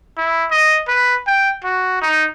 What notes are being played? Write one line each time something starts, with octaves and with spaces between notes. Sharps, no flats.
E4
D#5
B4
G5
F#4
D#4